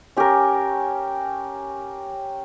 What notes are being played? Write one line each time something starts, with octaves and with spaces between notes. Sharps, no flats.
C#4 G4 A#4